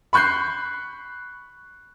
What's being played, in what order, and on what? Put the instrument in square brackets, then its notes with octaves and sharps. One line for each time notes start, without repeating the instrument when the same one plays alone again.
[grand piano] B5 C#6 F#6 G6 C7